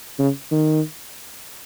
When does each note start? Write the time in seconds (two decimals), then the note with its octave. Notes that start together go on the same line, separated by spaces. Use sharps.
0.19 C#3
0.52 D#3